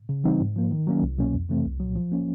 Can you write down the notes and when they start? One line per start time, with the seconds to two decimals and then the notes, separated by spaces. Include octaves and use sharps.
0.09 C#3
0.24 E3 G3 C4 D#4
0.40 G#2
0.56 F3 A#3
0.71 D#3
0.87 F#3 A#3 C#4
1.03 C2
1.19 B2 F#3 A#3 C#4
1.34 F2
1.49 C3 E3 A3 C4
1.65 C2
1.80 A#2 F#3
1.96 F3
2.12 A#3 C#4